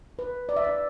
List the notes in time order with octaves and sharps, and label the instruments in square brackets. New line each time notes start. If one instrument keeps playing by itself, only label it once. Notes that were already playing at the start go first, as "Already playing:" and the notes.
[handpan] B4
D5
E5
D5